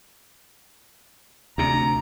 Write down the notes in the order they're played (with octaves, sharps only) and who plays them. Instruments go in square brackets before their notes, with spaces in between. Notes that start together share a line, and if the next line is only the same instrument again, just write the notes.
[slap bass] D2 C3 [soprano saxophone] A#5